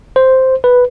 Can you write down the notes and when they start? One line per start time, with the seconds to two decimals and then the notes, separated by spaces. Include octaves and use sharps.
0.16 C5
0.64 B4